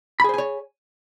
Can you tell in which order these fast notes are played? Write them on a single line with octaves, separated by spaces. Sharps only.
B5 G#4 C5 G#5 C#5